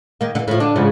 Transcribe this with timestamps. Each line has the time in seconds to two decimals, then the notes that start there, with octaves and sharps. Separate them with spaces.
0.21 D#3 A#3
0.35 D3 E3
0.48 A2 F3
0.60 D3 D4
0.76 G#2 C#3 F3